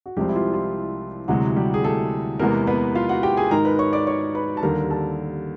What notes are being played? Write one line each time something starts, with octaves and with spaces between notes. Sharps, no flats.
F#4
C2 C3 F3 G3 G#3 C4 G4
E4
F4
F4
D2 C3 E3 F#3 G#3 F#4
G3 G4
G#4
A3 A4
E2 C3 E3 G#3 A#3 B3 A#4
B3 B4
F4 F5
F#4 F#5
G4 G5
G#4 G#5
G#2 D#3 G#3 A#4 A#5
B4 B5
C#5 C#6
D5 D6
C#5 C#6
B4 B5
A5
D#2 D3 G3 A#4 A#5
A4 A5